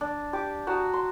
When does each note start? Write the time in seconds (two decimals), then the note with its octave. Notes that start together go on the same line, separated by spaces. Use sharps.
0.01 D4
0.33 G4 D6
0.67 F#4 A5 A#5 D#6
0.94 C6